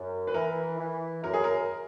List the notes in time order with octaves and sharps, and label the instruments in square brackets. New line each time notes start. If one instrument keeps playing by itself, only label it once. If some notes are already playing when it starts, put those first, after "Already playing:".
Already playing: [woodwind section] F#2
[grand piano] B4
[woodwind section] E3 [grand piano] A#4
[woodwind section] E3
[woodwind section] F#2 [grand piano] A#4
[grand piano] G#4
A#4